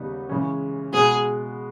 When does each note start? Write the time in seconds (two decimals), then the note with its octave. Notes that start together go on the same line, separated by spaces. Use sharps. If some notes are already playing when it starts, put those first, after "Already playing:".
Already playing: D#2 C#3 G3 B3 D#4
0.29 C#3 E3 G#3 C#4
0.93 B2 G#3 B3 G#4